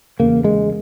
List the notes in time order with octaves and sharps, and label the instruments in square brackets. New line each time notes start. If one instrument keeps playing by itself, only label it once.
[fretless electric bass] E2 C#3 A#3
G#3